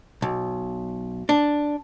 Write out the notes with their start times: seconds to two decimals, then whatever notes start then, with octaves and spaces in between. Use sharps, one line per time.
0.22 B1
1.29 D4